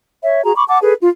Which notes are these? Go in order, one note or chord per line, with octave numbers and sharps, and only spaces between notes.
C#5 E5
F#4 G#4 A#5
B5 C#6 D6
F#5 A5 D6
G#4 A4 B4
F4